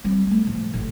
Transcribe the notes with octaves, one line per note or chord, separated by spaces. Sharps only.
G3 C4
A3 B3
A2 F3
A1 A2